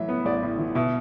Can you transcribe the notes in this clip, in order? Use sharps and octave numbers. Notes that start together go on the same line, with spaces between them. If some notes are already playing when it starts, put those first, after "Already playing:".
Already playing: A2 E3 F#3 E5
B3
A1 D5
A2
E3
B2 E5